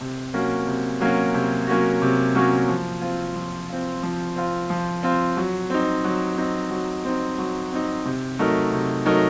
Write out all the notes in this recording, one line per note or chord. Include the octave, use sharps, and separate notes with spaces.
C3
F#3 A#3 C#4 F#4
C3
F#3 A#3 C#4 F#4
C3
F#3 A#3 C#4 F#4
C3
F#3 A#3 C#4 F#4
F3
C4 F4
F3
C4 F4
F3
C4 F4
F3
C4 F4
F#3
C4 D#4
F#3
C4 D#4
F#3
C4 D#4
F#3
C4 D#4
C3
F#3 A3 D#4 A#4
C3
F#3 A3 D#4 A#4